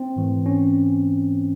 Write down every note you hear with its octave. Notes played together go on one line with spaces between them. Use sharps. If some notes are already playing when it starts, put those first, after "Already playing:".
Already playing: C4
G#2 E3 A3
C#4